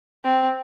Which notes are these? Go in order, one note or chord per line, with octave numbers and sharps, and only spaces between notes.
C4